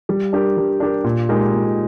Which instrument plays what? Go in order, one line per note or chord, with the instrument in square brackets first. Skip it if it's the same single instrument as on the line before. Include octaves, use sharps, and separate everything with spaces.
[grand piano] G3
D4 G4 A#4
G3
D4 G4 A#4
A#2
G#3 D#4 G4 A#4
A#2